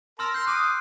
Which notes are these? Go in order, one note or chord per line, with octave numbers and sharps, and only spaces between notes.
A#4 A5 C6 E6 F6
C6 G6 C7
D6 D#6 F#6